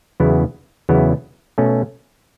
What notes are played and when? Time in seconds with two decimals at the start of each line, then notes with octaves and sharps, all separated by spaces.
0.20 E2 C#3 F#3 B3 E4
0.89 E2 C#3 F#3 B3 E4
1.58 B2 A3 C#4